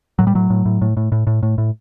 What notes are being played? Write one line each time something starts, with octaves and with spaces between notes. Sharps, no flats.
A2 F#3
G3
A2 F#3
A2
A2
A2
A2
A2
A2
A2
A2